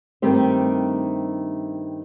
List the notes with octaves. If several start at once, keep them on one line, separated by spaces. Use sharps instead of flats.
G2 D#3 A3 C4 G4 C5